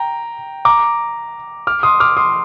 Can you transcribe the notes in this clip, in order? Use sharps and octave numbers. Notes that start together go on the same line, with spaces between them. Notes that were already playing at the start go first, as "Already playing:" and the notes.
Already playing: G5 A#5
A#5 D6
D6 F6
C6 D#6
D6 F6
C6 D#6